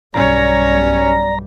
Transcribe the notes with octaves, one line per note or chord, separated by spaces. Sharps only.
B1 G2 G3 C#4 C#5 D5 A#5